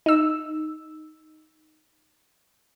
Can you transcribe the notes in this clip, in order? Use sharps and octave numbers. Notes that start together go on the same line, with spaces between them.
D#4 E6